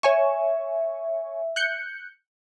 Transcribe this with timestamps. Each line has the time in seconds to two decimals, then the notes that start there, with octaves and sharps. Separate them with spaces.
0.03 C#5 E5 G#5 C#6
1.56 F#6 G6 C#7